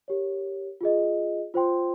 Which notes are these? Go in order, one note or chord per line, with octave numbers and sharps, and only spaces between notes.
G4 A#4 C#5
F4 G#4 D#5
F4 C5 G5 C6